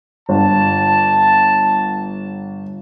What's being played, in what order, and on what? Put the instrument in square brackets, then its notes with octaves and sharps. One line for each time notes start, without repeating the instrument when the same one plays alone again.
[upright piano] G1 [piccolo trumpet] A5